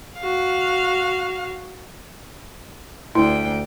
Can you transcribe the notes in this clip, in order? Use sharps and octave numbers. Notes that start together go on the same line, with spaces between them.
F#4 F5
D2 E4 G5